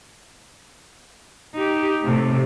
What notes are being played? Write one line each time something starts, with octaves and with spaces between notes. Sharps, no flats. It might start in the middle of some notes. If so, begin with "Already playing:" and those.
D#4 G4
A2 C3 A3